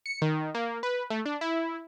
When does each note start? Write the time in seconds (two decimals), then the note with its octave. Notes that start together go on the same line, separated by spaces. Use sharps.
0.06 C#7
0.22 D#3
0.55 A#3
0.83 B4
1.10 A3
1.26 D4
1.41 E4